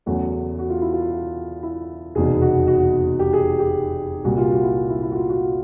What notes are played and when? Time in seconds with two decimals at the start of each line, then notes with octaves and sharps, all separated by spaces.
0.06 E2 C#3 F#3 A3 F#4
0.59 F#4
0.70 F4
0.82 E4
0.93 F4
1.63 E4
2.15 F1 E2 B2 G#4
2.42 F#4
2.67 F#4
3.19 G4
3.33 G#4
3.59 G4
4.24 C2 A#2 G3 F#4
4.37 F4
4.51 F#4
4.63 E4
4.90 E4
5.03 E4
5.11 F#4
5.16 F4
5.29 F#4